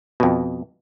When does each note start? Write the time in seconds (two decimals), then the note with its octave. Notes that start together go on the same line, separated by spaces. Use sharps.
0.20 F2 B2